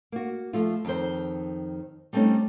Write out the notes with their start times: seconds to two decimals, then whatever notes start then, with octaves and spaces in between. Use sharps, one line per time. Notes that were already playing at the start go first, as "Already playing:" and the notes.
0.12 A#3 F#4
0.53 F3 A3 F4
0.85 F2 D#3 C5
2.13 G3 A3 C4 C#4 D#4